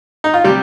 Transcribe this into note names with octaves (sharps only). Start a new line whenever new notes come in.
D#4
F4
C3 G3 C4 G4